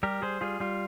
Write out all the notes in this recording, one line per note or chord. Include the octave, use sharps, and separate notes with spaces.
G3 G4 A#4
G3 G#4 C5
G3 F4 G#4
G3 F4